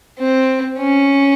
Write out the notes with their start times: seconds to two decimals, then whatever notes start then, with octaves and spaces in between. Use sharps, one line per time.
0.19 C4
0.79 C#4